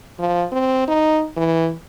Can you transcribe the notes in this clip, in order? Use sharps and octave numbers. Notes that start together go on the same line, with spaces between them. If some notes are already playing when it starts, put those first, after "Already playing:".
F3
C4
D#4
E3